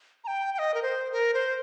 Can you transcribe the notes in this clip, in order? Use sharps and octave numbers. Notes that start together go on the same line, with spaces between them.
A#5
G5
G5
D#5
A#4
C5
A#4
C5